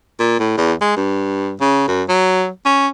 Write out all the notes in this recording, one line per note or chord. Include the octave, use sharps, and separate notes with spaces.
A#2
A2
E2
G#3
G2
C#3
F#2
F#3
C#4